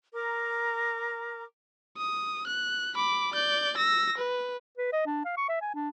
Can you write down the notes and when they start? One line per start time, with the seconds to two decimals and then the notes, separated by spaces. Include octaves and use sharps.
0.14 A#4 A#5 D6
1.97 D#6
2.47 F#6
2.94 B5 D6
3.34 D5 G6
3.77 E6 A#6
4.17 B4
4.78 B4
4.92 D#5
5.06 D4
5.25 F5
5.37 C#6
5.49 E5
5.61 G#5
5.74 D4